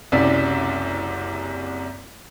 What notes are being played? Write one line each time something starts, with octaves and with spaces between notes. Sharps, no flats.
F#1 C2 C3 C#4 D5 B6